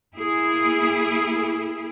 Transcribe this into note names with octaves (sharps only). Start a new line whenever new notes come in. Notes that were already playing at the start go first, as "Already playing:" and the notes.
A#3 E4 G#4